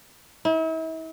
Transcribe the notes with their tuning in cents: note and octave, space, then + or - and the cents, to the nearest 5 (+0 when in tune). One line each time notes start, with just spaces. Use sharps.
E4 -40